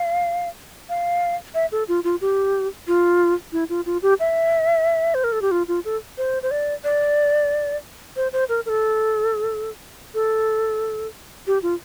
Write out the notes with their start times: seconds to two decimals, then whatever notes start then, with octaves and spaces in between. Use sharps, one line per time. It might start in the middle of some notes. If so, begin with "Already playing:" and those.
Already playing: F5
0.89 F5
1.54 E5
1.72 A4
1.88 F4
2.04 F4
2.21 G4
2.87 F4
3.53 E4
3.69 F4
3.86 F4
4.02 G4
4.20 E5
5.14 C5
5.24 A#4
5.32 A4
5.42 G4
5.51 F4
5.68 F4
5.85 A4
6.18 C5
6.43 C5
6.51 D5
6.84 D5
8.16 C5
8.33 C5
8.49 A#4
8.66 A#4
8.69 A4
10.14 A4
11.47 G4
11.63 F4